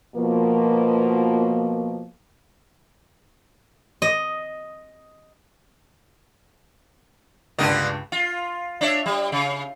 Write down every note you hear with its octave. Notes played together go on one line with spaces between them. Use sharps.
B2 F3 A#3
D#5
C#2 G2 D3 A#3 D#5
F4
D4 C#5 E5
G3
C#3